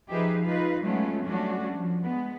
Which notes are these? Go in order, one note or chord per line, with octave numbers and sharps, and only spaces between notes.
F3 D#4 G4 G#4 B4 E5
D#4 F4 B4 F5
F#3 G#3 A3 B3 C#4 F4
F#3 G3 A3 C#4 D4 F#4
F3
G#3 B3